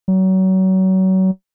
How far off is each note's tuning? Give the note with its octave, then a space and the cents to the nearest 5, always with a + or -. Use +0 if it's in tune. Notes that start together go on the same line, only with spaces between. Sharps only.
F#3 +30